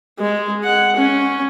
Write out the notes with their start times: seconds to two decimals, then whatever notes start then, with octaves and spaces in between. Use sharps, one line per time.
0.20 G#3
0.65 F#5
0.97 C#4